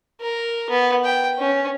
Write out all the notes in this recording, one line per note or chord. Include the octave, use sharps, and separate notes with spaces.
A#4
B3
G5
C#4